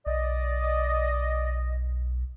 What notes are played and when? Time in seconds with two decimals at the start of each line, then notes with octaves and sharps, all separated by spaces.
0.06 B1 D5 D#5